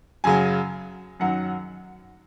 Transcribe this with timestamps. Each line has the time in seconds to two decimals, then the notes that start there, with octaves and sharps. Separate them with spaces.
0.24 F#2 C#3 F#3 G#5
1.20 F#2 D#3 F#3 F#5